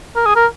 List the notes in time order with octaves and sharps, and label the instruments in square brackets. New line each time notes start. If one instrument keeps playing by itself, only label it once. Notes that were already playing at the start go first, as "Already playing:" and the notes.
[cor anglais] A#4
G#4
A#4